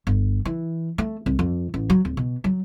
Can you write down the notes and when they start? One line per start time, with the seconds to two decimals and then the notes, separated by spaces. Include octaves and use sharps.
0.07 G1
0.45 E3
0.98 A3
1.26 C2
1.39 F2
1.74 A1
1.90 F#3
2.05 D1
2.17 B2
2.44 F#3